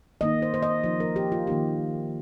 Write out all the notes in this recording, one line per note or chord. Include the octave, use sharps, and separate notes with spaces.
D#3 A#3 D#4 D#5
C5
C5
D#5
F3 D#4 C5
A#4
G4
F4
D#3 A#3 D#4 G4